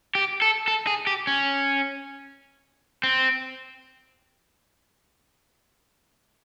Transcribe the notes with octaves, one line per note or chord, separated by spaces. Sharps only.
G4
A4
A4
G#4
G4
C#4
C4